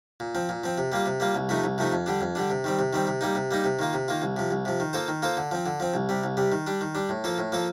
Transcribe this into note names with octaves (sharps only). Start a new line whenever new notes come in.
A#2
F3 C4
A#2
F3 C4
C3
G3 A#3 F4
C3
G3 A#3 F4
C2
C3 F3 A3 D#4
C2
C3 F3 A3 D#4
F2
D3 G3 D4
F2
D3 G3 D4
C3
D#3 G3 C4
C3
D#3 G3 C4
C3
G3 A#3 D#4
C3
G3 A#3 D#4
C3
D#3 A#3 F4
C3
D#3 A#3 F4
C2
C3 F3
C2
C3 F3
D#3
A#3 F4 A4 C5
D#3
A#3 F4 A4 C5
D3
F3 C4
D3
F3 C4
C2
C3 G3
C2
C3 G3
D#3
G3 D4
D#3
G3 D4
A2
F3 A#3 F4 A4
A2
F3 A#3 F4 A4